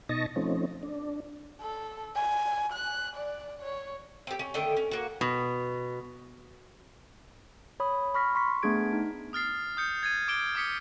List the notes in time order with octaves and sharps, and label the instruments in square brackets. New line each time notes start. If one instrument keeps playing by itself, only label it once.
[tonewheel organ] B2 D#4 D#5 A5 C#6 A#6
F3 A3 C4 C#4 D#4
D4
[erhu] A4
G#5
F#6
D5
C#5
[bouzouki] C4 G4
C#4
D3 D#3 A3 G5
C#4
A#3 F#4
[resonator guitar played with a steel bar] B2
[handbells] C#5 B5 D#6
B5 C#6 F6 A#6 B6
C6 C#6 B6
A3 B3 D4 G#4 G#6 D7
D#4
[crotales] D#6 F6 A6 C7
D#6 G6 C#7
G#6 A6 D#7
D6 D7 G7
D6 D#6 B6 C#7 G7